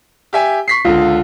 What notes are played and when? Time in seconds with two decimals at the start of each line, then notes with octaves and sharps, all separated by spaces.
0.33 G4 E5 G#5
0.68 C#6 B6 C7
0.85 C#2 D3 F4